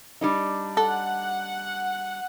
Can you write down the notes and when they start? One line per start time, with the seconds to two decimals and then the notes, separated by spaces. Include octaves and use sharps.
0.21 G3 D4 D#4
0.77 A4 F#5